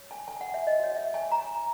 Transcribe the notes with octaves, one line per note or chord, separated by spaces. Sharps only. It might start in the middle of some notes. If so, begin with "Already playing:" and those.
Already playing: C#5
G#5
G#5
F#5
E5
D#5
F#4 C#5
E5
G#5
A#5